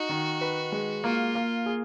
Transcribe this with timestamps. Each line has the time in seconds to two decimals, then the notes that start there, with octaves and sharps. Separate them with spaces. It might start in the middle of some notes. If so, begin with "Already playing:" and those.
Already playing: D#4 F#4
0.09 D#3
0.41 B4
0.72 G#3
1.04 A#3 F4
1.35 A#3
1.66 G#4